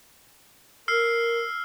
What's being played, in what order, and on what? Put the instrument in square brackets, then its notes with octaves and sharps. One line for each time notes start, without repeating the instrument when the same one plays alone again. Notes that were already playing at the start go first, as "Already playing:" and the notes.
[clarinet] A#4 [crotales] E6 F6 C7